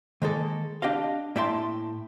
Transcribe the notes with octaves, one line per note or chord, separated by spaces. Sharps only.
D#3 G#3 A#3 A4
D4 G4 D#5 F5
A2 A#3 E5 G5 A5 C6